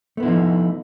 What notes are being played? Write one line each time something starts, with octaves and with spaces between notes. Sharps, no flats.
F3 A3 B3 D#4 E4